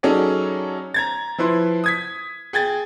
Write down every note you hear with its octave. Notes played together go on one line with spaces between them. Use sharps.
F#3 C#4 D#4 G#4 A4 D5
A#5 G#6 A6
F3 E4 B4 C6
D#6 G#6 B6
G#4 G5 G#6 A6